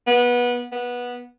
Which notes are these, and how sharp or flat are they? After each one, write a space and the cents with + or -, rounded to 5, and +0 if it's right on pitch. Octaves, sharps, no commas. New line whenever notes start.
B3 -20
B3 -15